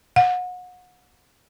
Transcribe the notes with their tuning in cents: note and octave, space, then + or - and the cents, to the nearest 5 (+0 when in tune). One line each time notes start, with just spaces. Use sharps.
F#5 -35